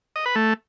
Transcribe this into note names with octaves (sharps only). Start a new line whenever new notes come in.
D#5
B4
A3